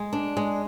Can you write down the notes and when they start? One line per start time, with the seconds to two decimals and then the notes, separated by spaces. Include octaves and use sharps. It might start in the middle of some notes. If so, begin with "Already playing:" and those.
Already playing: G#3
0.13 D4
0.37 G#3